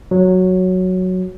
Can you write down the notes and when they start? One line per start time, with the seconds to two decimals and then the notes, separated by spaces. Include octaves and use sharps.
0.11 F#3